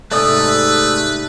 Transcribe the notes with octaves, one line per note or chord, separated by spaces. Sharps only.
G#2 C3 A3 D#4 A4 B4 D5 D#6